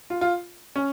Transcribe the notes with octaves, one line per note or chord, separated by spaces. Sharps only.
F4
F4
C#4